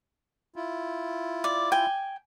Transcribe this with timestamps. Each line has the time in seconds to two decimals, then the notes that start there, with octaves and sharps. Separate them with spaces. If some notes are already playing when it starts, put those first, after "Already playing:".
0.56 E4 F4
1.44 D5
1.72 G5 G#5